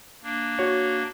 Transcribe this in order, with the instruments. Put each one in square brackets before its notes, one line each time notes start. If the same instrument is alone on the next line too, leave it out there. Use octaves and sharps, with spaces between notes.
[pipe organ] A#3 D4
[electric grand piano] F#4 C#5